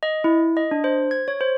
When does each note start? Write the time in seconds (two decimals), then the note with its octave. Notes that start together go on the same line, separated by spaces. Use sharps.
0.03 D#5
0.24 E4
0.57 D#5
0.71 D4
0.84 C5
1.11 G#6
1.28 C#5
1.41 C5